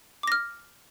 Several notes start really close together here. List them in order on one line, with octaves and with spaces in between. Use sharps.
D6 A#6 F6